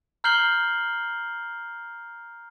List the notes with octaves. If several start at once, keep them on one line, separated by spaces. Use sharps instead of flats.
A#5 F6 G6 C7 F#7 G7